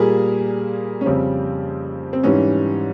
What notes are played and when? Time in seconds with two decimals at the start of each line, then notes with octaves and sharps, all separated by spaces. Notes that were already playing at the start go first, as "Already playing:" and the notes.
Already playing: A#2 G3 A#3 G#4
1.01 C#4
1.06 F2 C#3 G3 C4
2.13 C4
2.23 G#2 E3 G3 C#4